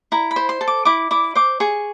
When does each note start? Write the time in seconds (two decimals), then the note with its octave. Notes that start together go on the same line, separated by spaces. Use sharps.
0.12 E4 A#5
0.31 B5
0.36 C5
0.49 C6
0.61 A4
0.68 D6
0.85 E4 D6
1.11 E4 D6
1.35 C5 D6
1.60 G#4 C#6